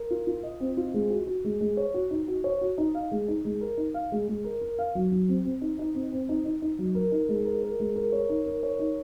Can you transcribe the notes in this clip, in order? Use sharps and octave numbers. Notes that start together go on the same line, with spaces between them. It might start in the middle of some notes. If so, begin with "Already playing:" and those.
Already playing: A#4
F4
F4
D#5
C4
F4
G#3
F#4
F#4
G#3
G#3
C#5
F#4
D#4
F#4
C#5
F#4
D#4
F5
G#3
D#4
G#3
A#4
D#4
F5
G#3
G#3
A#4
A#4
F5
F#3
F#3
C4
C4
D#4
D#4
C4
C4
D#4
D#4
D#4
F#3
A#4
D#4
G#3
A#4
A#4
G#3
A#4
C#5
D#4
A#4
C#5
D#4